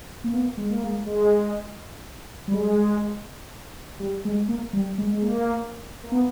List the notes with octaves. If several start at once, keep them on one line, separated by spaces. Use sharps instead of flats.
A#3
B3
G#3
A#3
G#3
G#3
G3
G#3
G3
G#3
A#3
G3
G#3
G#3
A#3
A#3
B3